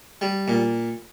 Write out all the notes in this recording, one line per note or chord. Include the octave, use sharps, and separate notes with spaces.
G3
A#2